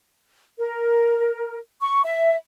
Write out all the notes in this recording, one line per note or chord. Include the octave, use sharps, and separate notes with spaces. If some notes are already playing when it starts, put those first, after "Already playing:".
A#4
C#6
E5